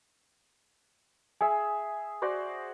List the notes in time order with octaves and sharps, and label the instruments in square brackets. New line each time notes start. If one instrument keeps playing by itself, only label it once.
[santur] G#4 E5 [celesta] G#5
[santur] F#4 C5 D5